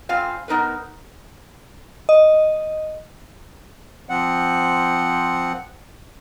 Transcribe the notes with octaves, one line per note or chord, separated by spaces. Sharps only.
G2 C4 F4 F5 G#5
B3 D#4 A#4 B4
D#5
F3 C4 F#5